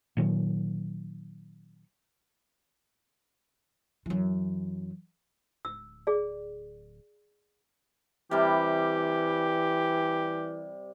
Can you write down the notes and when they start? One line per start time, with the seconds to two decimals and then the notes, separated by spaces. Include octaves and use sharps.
0.17 A#2 D#3 F#3
4.06 F#2 E3
5.65 D1 E6
6.07 G#4 D5
8.31 C3 E3 G3 G4